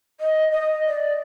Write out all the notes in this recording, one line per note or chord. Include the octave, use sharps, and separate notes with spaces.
D#5
D#5
D5